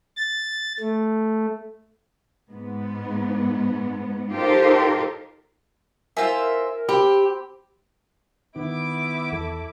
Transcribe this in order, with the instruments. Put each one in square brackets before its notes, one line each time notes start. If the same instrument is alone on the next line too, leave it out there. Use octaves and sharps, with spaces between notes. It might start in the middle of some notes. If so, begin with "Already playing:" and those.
[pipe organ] A6
A3
[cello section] G#2 B3
D#4 F4 G4 A4 A#4 C5
[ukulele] E4 C5 G#5 [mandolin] F4 E5 [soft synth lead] A#4
[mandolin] C4 [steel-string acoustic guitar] G4 [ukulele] B5
[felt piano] D#3 [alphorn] B3 [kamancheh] E4 D6
[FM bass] E2 [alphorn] A4